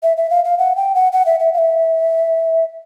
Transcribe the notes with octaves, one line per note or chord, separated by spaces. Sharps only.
E5
E5
F5
F5
F#5
G5
F#5
F#5
E5
E5
F5
E5